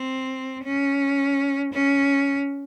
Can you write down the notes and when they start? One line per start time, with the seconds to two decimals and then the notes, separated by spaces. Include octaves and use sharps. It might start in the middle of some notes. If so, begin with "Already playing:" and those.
Already playing: C4
0.64 C#4
1.72 C#4